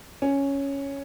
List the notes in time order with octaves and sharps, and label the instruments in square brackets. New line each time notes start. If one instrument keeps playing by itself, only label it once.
[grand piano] C#4